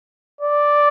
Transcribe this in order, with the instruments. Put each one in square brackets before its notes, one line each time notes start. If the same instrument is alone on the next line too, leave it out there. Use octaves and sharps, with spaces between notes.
[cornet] D5